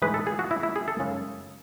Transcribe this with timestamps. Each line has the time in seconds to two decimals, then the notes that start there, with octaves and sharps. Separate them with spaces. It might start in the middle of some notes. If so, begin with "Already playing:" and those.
0.02 A2 E3 G#3 D#4 B4
0.14 A4
0.27 G#4
0.39 F#4
0.51 E4
0.63 E4
0.76 G#4
0.88 A4
0.99 F#2 C#3 G#3 D#4